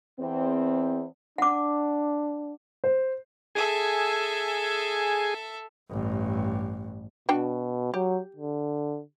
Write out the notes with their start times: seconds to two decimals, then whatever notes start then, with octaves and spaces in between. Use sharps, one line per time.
0.20 E2 C4
1.38 D4 F#5 D6
2.84 C5
3.55 G#4 A4 E5 G#5
5.90 A1 G2
7.29 B2 D4 F#4 G5
7.94 F#3 G4
8.37 D3